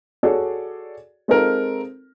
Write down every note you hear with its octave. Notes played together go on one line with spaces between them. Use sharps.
F#4 G#4 A4 C#5 D5
G#3 C4 D#4 F4 A4 A#4